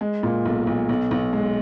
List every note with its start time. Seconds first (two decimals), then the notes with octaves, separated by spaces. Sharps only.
0.01 G#3
0.23 A#2
0.45 B1
0.67 B1
0.89 B1
1.11 B1
1.33 G#3